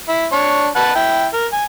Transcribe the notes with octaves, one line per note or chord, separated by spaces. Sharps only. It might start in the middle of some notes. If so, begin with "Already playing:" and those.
E4
D4 C#5
B4 F#5 A5
E4 G5
A#4
G#5